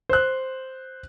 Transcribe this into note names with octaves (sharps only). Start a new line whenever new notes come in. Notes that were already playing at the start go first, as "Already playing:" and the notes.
C5 F#6